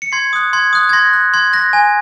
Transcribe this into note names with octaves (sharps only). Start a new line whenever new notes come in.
C#7
C6 G#6 C7
D#6 F#6
C6 G#6
D#6 F#6
G#6
C6 A#6
F#6
C6 G#6
F#6 A#6
G#5